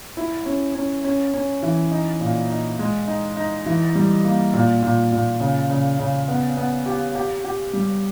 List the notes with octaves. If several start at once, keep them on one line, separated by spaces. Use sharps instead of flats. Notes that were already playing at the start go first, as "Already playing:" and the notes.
E4
C#4
C#4
C#4
C#4
E3
D#4
A#2
D#4
G#3
D#4
D#4
E3
G3
A#3
A#2
A#2
A#2
C#3
C#3
C#3
B3
B3
G4
G4
G4
G3